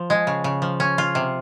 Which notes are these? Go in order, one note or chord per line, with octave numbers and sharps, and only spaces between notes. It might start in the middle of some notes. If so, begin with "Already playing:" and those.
Already playing: F3
G#3
C#3
C#3
F3
C#4
F4
C3